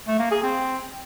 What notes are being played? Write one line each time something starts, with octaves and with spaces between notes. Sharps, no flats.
A3
A#3
G#4
C4